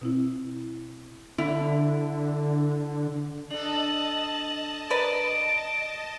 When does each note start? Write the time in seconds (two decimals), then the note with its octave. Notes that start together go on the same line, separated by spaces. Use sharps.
0.01 B2 C4 E4
1.38 D3 E4
3.50 D4 A4 D#5 A5 F#7
4.90 A#4 B4 D5 D7